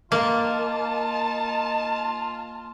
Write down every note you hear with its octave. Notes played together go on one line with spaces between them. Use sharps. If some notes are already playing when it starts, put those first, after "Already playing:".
A#3 D#4 F4 A5